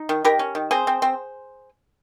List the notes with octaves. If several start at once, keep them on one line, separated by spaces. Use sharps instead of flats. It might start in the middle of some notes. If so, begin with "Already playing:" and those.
Already playing: D#4
D#3
D#3 G4 A#4
C#4
D#3
C4 G#4 C5
C4
C4